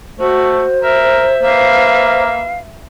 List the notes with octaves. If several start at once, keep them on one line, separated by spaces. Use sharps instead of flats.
A3 F#4 C5
A#4 E5
A#3 B4 E5 F5